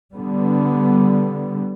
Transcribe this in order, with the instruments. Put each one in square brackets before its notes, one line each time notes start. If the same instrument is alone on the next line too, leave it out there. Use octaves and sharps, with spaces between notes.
[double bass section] D3 G3 B3